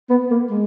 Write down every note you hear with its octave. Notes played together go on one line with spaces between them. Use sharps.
B3
A#3
G#3